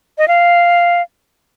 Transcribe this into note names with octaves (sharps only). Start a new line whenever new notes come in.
D#5
F5